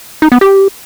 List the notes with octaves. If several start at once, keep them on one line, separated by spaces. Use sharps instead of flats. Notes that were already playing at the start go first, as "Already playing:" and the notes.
D#4
B3
G4